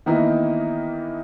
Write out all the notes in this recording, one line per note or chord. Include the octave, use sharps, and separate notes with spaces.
D#3 E3 A#3 B3 D#4 E4